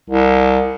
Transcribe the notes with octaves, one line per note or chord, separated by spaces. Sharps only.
C2